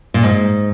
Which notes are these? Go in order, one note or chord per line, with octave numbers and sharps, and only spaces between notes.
A#2
G#2